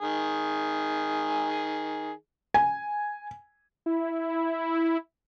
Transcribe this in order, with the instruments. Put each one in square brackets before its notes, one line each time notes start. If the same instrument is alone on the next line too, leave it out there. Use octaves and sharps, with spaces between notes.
[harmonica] D#3 G#4
[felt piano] G#5
[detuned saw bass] E4